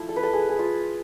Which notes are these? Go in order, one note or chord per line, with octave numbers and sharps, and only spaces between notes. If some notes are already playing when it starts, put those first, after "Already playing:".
Already playing: F3 A3 E4
A4
B4
A4
G#4
G#4
F4